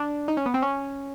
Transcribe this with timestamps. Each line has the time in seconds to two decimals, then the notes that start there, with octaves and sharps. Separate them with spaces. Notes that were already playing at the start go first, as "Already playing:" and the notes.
Already playing: D4
0.28 D#4
0.37 C#4
0.46 B3
0.54 C4
0.62 C#4